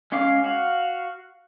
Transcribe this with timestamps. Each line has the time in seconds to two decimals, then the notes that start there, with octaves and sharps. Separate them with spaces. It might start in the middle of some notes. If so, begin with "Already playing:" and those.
0.12 G#3 C#4 C#5 F5 D6
0.44 F#4 F5